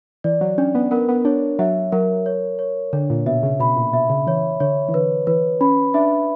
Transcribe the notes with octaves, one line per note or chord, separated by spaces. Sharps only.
E3 D5
F#3
C#4 D4
B3
B3 A#4
B3
D4 C#5
F#3 E5
F#3 A#4
C#5
C#5
D3 D4
A#2
B2 E5
C#3
B2 B5
A#2
B2 E5
C#3
E3 C#5
D3 C#5
E3
D3 B4
E3 B4
C#4 B5
D4 E5